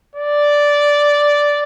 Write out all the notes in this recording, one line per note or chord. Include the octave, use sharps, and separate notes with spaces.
D5